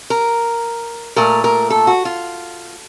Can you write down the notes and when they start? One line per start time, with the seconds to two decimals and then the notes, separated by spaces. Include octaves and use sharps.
0.10 A#4
1.16 A#2 A3 A#4
1.44 A#4
1.70 A4
1.87 F#4
2.05 F4